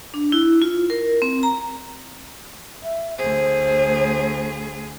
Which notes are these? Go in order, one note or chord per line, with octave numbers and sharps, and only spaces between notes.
D4
E4
F4
A#4
C4
A#5
E5
D2 G#4 C5